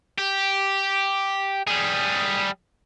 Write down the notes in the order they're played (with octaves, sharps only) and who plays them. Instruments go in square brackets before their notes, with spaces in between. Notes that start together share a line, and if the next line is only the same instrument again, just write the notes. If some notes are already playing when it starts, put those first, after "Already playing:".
[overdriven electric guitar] G4
G3 G#4